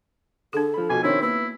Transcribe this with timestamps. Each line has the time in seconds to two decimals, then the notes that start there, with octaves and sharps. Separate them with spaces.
0.53 D3 D4 G#4 A4
0.74 F3 B5
0.90 B2 F3 F#4 G#5
1.03 D#3 C4 D4 E4 C#5
1.22 A#3 B3 E4